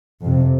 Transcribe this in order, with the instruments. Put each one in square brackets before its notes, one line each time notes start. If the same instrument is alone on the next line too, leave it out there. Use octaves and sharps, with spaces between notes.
[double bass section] F2 C3